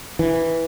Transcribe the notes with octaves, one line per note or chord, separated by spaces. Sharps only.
E3